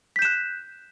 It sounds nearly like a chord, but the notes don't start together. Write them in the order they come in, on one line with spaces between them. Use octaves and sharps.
B6 G6 E7 F#6